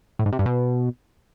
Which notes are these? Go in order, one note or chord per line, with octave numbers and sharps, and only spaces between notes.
A2
G#2
C3
G2
B2